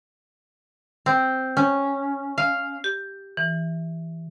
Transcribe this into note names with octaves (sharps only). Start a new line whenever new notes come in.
C4
C#4
F5
G4
E3